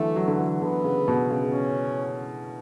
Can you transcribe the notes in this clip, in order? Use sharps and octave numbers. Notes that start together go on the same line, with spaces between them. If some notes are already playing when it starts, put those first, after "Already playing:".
Already playing: D3 E3 F#3 A3
F#3
D3
E3
D3 B3
C#3
B2
C#3
C#4